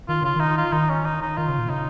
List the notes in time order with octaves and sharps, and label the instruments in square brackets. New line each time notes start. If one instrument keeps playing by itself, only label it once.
[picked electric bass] D#3 [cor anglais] F4
[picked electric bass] C#3 [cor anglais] F4
[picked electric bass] D#3 [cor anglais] D#4
[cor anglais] F4
[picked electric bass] D#3 [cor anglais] D#4
[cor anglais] C#4
D#4
D#4
[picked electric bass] D#3 [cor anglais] F4
[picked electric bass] C#3
A#2
[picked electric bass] C#3 [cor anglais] D#4